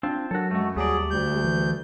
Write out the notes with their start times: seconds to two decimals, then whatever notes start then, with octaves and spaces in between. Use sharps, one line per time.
0.03 C4 D4 F4
0.31 F#3 F#4 A4 A#4
0.51 F#2 G#3 A3 F#4
0.76 D#2 F#3 G3 A3 G#4 D5
1.11 D2 G6
1.44 E3